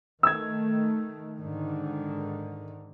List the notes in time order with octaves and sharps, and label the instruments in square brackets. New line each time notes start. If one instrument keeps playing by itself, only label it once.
[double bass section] D#3 A3 [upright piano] E6 G#6
[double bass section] G#2 D3 D#3